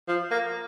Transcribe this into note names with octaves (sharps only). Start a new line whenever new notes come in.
F3
A#3